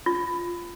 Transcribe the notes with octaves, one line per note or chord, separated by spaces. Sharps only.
F4